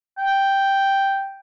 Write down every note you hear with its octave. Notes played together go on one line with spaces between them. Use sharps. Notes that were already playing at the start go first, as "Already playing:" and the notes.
G5